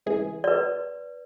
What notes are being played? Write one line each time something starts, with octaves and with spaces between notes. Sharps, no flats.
C#2 E3 G#4
B4 D5